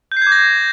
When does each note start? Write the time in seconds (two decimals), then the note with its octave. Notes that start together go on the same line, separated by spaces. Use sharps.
0.12 G6
0.17 C7
0.22 G#6
0.27 D6
0.32 A#6